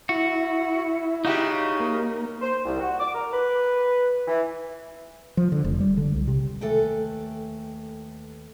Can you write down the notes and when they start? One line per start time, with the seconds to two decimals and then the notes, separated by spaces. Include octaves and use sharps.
0.09 E4 F#4
1.25 C#3 D#4 F#4 G4
1.80 A#3
2.41 C5
2.65 C2
2.80 F#4
3.00 D6
3.14 A#4
3.33 B4
4.28 E3
5.37 F3
5.52 D3
5.64 F1
5.80 G3
5.97 D3
6.14 C2
6.28 C3
6.61 D#2 A3 A4 B4 G5 G#5